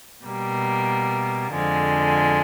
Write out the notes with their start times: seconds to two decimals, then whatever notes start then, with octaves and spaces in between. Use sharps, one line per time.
0.25 B2 G3 A#3
1.54 F2 D3 F3 G#3